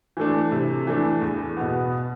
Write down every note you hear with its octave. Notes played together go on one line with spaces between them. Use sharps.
E3 A3 D4
C3
E3 A3 D4
E2
B2 B3